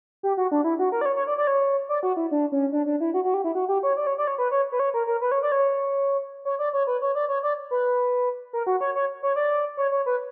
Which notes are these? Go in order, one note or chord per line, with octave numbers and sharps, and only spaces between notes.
G4
F#4
D4
E4
F#4
A#4
D5
C#5
C#5
D5
D5
C#5
D5
F#4
E4
D4
C#4
D4
D4
E4
F#4
F#4
G4
E4
F#4
G4
C#5
D5
C#5
D5
C#5
B4
C#5
B4
C#5
A#4
A#4
B4
C#5
D5
C#5
C#5
D5
C#5
B4
C#5
D5
C#5
D5
B4
A#4
F#4
C#5
C#5
C#5
D5
C#5
C#5
B4